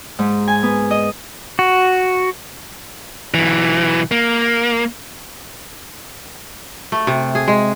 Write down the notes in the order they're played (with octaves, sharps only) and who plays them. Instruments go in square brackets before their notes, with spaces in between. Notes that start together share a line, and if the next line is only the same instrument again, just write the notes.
[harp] G#2
G#5
B3
D#5
[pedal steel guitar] F#4
[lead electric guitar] B1 E3
A#3
[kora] A3
C3
G#4
G#3